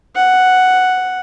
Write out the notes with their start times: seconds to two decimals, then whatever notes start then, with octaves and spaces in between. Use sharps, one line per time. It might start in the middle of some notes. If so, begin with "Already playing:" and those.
0.16 F#5